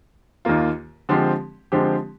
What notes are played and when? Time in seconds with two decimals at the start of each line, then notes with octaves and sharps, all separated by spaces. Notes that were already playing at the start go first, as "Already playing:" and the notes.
0.45 D#2 D#3 A#3 F4
1.09 D3 F3 G#3 C4 G4
1.72 D3 F3 G#3 C4 G4